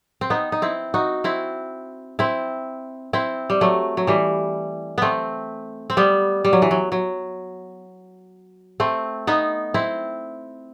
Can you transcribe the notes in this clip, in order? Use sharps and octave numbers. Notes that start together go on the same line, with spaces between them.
C4
B3 D#4
D#4
C4 E4
D#4 F#4
C4 E4
C4 E4
C4 E4
G3
F#3 A3
F#3
E3 G3
A3 B3 C4
C4
G3 B3
G3
F#3
E3
F#3
F#3
A3 C4
B3 D#4
C4 E4